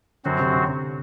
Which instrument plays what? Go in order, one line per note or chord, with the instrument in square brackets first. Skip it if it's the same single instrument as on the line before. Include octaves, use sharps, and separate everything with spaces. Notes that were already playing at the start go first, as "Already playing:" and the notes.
[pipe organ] F#2 F#3 C4 F#4 C5 [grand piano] D3
[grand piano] C3
C3
C3